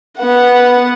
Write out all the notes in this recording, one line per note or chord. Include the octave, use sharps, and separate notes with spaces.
B3 F#5